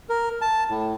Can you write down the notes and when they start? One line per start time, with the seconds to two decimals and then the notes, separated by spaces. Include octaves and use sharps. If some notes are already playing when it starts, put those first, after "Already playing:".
0.09 A#4
0.41 A5
0.69 A2